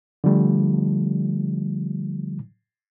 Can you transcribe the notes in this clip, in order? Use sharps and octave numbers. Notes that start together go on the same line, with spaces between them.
D3 F3 G3 A3